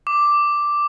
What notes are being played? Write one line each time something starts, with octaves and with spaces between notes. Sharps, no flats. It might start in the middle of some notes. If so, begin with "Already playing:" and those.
D6